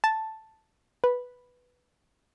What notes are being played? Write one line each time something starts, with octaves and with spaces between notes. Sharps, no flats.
A5
B4